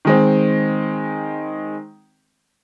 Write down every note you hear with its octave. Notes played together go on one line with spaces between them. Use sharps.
D#3 G#3 C4